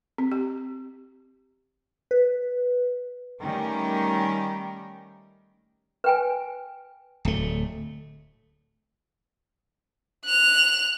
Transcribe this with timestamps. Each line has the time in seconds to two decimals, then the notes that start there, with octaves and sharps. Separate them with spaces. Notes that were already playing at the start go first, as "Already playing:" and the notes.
0.18 C4
0.32 G4
2.11 B4
3.42 D#3 G3 A3 C#4 G4 A#4
6.04 B4 G5 G#5
7.25 D1 A3
10.25 F#6 F7